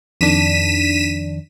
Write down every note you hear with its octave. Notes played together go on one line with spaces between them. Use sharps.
F2 D#3 D4 B6 D#7 E7